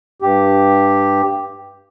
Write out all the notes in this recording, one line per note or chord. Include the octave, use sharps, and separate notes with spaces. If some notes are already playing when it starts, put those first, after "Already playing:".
G2 G4